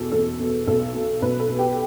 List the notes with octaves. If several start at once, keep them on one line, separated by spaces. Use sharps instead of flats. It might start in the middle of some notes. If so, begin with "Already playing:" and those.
Already playing: E2 B2 A4
E2 A4
B2
B1 A4
B2
B1 B4
A4
B2
G4